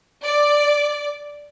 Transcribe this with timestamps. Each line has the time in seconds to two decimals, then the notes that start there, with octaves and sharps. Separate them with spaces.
0.24 D5